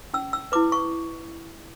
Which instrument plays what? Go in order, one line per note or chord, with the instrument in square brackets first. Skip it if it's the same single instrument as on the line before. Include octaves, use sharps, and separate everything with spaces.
[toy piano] C#4 E6
E6
E4 B4 D6
C#6